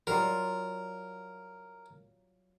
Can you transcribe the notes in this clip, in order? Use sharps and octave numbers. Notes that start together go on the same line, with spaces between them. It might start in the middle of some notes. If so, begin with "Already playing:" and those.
F#3 G3 F4 A#4